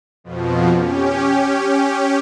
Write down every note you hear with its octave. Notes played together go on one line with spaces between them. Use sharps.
F2 B2 F3
C#4 G4